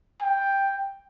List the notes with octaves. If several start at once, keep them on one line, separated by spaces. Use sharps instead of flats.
G5